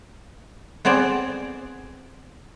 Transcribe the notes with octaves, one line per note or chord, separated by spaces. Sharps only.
B3 C4 G#4 C5 D5